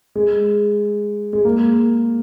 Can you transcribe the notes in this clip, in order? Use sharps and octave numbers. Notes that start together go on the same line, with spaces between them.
G#3
G#3
A#3